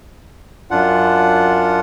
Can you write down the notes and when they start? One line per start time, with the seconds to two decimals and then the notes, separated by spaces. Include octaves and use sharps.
0.71 F#2 D4 F4 F#5